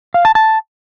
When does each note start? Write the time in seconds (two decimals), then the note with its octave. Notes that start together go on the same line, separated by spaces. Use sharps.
0.14 F5
0.25 A5
0.35 A5